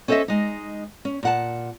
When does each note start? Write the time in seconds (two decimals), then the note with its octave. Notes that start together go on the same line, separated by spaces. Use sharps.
0.08 C#4 A4 C5 C#5 D#5 E5
0.28 G#3 D#4
1.05 C#4
1.23 A#2 F#5 A5